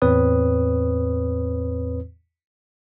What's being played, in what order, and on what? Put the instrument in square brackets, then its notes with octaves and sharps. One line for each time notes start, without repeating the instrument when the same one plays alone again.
[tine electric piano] E2 A2 C4 B4 C#5 D#6